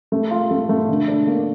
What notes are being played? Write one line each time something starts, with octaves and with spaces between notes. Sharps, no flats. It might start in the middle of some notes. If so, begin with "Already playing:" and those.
A3
F4
A3
A3
D3
D4
A#3